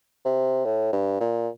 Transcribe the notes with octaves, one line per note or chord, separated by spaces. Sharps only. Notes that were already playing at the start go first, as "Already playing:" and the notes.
C3
A2
G2
A#2